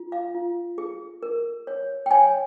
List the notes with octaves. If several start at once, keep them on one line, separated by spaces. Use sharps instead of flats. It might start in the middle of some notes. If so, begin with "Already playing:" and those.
Already playing: F4
F5
F4
G#4
A#4
C#5
G5
C#5 G#5